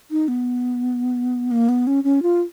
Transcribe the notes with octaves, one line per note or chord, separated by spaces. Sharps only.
D#4
B3
A#3
B3
C#4
C#4
F4